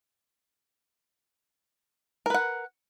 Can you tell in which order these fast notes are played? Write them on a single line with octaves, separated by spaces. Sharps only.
A#4 B4 F#5